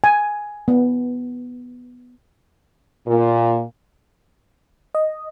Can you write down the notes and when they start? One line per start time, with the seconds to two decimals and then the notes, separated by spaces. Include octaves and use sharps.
0.04 G#5
0.68 B3
3.07 A#2
4.95 D#5